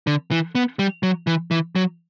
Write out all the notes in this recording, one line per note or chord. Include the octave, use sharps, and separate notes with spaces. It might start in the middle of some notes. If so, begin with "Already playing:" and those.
D3
E3
B3
G3
F#3
E3
E3
F#3